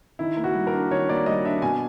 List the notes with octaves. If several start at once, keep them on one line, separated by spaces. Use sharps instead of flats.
D#3 E4
A#3
F#4
G3
A#4
D4
D#3 C#5
A#3 D5
G3 D#5
D4 E5
B2 G#5